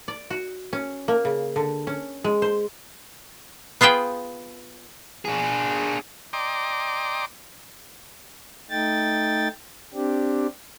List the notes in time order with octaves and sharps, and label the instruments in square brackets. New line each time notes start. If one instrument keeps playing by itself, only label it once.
[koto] D5
F#4
C#4
A#3
C#3
D3
C#4
G#3
C5
B3 F4 G#4 B4 G5
[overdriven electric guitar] D4 G#4
[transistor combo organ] D5 D#5 G5 A#5 C6 D6
[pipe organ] A3 D#4 G5 A6
C4 D4 G4